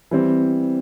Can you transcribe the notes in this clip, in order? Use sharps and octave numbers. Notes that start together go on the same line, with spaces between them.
E3 G3 C4